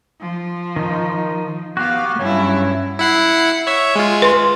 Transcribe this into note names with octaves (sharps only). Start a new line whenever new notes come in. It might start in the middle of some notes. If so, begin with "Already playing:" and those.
F3
D#3 D#4
B3 F#4 G4 F5
G2 F#3 C#4 E4
E4 F#5 C7
C#5 E5
G#3 F4
B4 C6